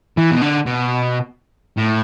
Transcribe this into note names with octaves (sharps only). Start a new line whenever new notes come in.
E3
B2
D3
B2
A2